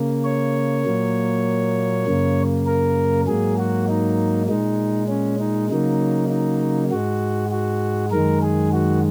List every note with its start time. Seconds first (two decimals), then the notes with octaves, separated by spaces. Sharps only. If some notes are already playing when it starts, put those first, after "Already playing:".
Already playing: C#3 A#3
0.25 C#5
0.86 A#2 F#3 A#3
2.07 F#2 C#3 A#3
2.67 A#4
3.27 G#2 F#3 A#3 G#4
3.58 F#4
3.88 D#4
4.48 A#2 G#3 D#4
5.09 C#4
5.40 D#4
5.70 C#3 F#3 A#3 D#4
6.30 D#4
6.91 G#2 G#3 F#4
7.51 F#4
8.11 F#2 D#3 G#3 A#4
8.42 G#4
8.73 F#4